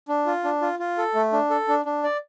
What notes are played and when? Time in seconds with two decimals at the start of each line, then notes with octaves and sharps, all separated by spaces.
0.08 D4
0.26 F4
0.44 D4
0.62 F4
0.79 F4
0.98 A4
1.15 A3
1.33 D4
1.50 A4
1.68 D4
1.85 D4
2.04 D5